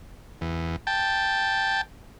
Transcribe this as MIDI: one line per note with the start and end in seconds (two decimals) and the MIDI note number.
0.41 0.76 40
0.87 1.81 79
0.87 1.81 81